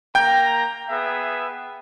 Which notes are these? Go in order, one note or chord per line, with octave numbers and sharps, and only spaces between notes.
A#3 G5 A#5 G6
B3 G#4 E5